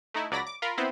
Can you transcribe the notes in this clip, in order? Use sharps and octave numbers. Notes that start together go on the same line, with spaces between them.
A3 D#4 E4
C#2 F#3 D5 B5 A#6
D6
F4 A#4 B5
B3 C4 E4 C5 B5